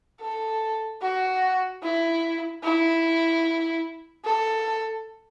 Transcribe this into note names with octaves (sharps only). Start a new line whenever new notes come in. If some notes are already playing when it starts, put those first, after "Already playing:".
A4
F#4
E4
E4
A4